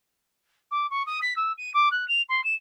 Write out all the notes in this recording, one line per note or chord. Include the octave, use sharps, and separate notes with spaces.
D6
C#6
D#6
B6
E6
D#7
D6
F#6
F7
C6
E7